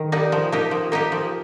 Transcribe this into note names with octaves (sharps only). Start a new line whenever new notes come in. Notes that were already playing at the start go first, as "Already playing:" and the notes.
Already playing: D#3
G3 A#3 D#4
F3
A#3 D#4 G4
F3
A#3 D#4 G4
F3